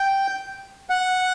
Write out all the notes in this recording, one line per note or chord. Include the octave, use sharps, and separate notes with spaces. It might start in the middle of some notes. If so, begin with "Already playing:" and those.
Already playing: G5
F#5